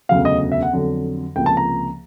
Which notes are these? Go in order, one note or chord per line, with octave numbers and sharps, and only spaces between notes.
E1 D2 C#3 F#3 F5
D#5
E5
F#5
F2 D3 F#3
C#2 C3 F3 A#3 G5
A5
A#5